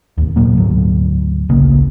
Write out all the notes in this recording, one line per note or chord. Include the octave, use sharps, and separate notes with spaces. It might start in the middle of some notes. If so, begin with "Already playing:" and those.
G1 D#2
A#2 F#3 A#3
D2 G#2 F#3
D1 A#1 C#3 A#3